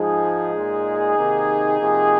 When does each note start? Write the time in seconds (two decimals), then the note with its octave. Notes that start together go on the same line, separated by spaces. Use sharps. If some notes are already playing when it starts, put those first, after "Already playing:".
Already playing: G#2 F3 G#3 D#4 G#4
0.54 A#2 G#3
1.16 C3 D#3 A#3
1.79 C3 F3 A#3